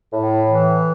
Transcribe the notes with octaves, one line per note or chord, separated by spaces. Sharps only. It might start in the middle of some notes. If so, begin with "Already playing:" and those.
A2
E3